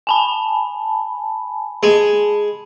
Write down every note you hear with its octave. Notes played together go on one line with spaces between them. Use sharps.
G#5 A5 B5
G#3